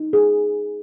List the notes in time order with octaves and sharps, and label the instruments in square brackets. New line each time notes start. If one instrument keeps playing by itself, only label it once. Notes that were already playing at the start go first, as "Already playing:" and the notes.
Already playing: [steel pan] D#4
G#4